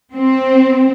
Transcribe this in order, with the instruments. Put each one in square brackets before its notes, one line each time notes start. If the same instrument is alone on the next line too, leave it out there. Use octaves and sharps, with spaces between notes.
[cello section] C4